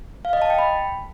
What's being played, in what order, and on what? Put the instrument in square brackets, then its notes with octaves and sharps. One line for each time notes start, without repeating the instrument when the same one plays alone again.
[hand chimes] F5
D#5
A5
G5
B5